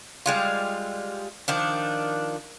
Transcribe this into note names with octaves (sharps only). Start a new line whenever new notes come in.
G3 G#3 F4
D#3 F3 D4